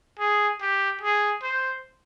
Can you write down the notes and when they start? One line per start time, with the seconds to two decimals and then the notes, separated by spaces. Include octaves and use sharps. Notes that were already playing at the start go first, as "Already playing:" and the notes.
0.19 G#4
0.61 G4
1.01 G#4
1.43 C5